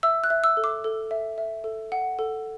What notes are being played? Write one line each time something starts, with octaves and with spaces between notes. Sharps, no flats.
E5 E6
F#6
E5
E6
A4
D6
A4
E5
E5
A4
F#5
A4